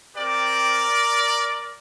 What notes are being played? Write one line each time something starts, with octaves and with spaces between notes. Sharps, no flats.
C4 G4 A#4 D5